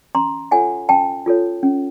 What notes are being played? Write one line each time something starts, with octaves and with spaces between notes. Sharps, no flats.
C#4 A#5 C6
F4 A4 C#5 F#5 G#5
C#4 G5 A5
F4 A4 C#5
C#4